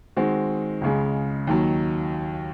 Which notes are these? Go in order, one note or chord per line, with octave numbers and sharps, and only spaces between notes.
D#3 G#3 C4 F#4
C#2 C#3 G#3
D#2 D#3 F#3